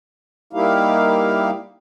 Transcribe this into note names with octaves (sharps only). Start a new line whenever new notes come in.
G3 A#3 D#4 E4 G4 F5